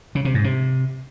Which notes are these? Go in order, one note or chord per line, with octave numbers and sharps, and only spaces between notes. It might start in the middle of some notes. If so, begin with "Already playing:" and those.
C#3
C3
G#2
C3